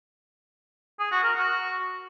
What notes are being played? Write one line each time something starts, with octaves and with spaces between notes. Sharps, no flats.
G#4
F#4
A#4
F#4